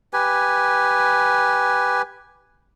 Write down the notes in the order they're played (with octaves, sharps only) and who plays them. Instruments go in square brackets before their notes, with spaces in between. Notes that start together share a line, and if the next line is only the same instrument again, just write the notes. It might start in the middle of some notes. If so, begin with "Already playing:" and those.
[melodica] G4 B4 G#5